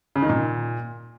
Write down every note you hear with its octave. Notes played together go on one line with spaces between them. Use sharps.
C#3
D#3
A#2